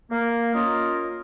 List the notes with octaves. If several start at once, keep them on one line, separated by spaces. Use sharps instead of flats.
A#3
C#4 F4 A#4 D#5